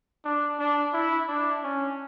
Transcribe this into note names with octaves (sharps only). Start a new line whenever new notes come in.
D4
D4
E4
D4
C#4